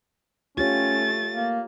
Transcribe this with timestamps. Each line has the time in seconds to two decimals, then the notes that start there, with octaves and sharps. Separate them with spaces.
0.58 A3 C#4 F4 G4 C#5 A6
1.34 A#3